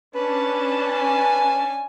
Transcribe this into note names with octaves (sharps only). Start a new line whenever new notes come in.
C#4 D4 B4 A5
G#5